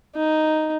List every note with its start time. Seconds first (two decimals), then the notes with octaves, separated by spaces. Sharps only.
0.15 D#4